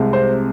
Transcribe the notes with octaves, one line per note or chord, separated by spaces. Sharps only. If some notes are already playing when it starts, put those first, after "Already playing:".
Already playing: C2 C3 G#3
C5